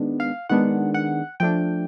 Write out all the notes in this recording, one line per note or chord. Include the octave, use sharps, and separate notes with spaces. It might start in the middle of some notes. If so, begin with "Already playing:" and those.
Already playing: D#3 G#3 B3 D4
F5
D#3 G#3 B3 D4 F#5
F#5
F3 A3 D4 G5